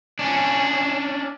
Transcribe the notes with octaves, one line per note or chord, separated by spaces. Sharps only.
C#4 D4